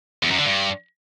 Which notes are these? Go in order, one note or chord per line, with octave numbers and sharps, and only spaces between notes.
E2
F#2
D3
G2